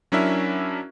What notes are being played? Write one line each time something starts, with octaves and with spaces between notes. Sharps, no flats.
F#3 C#4 D4 E4 A#4 E5